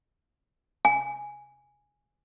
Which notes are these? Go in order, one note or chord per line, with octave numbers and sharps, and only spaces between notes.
G#5